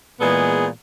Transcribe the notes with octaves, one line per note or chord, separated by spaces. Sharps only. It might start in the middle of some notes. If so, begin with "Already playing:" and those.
A#2 E3 G#3 B3 G#4